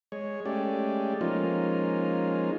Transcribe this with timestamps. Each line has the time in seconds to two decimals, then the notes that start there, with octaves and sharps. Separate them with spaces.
0.12 G#3 C#5
0.46 G#3 A3 C#4 G4 D5
1.21 F3 G#3 A#3 C#4 D#4 F4